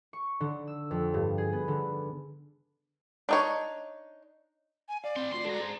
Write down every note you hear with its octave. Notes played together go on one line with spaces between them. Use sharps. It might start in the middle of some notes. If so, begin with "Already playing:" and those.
C#6
D3
E6
F2
G2
G#4
B3
D3
D4 D#4 C#5
G#5
D5 F5
C4 E4 C6
D2 A2 F4 C6
G#3 D4 F#4 A4 A#5
G#2 G#4 C5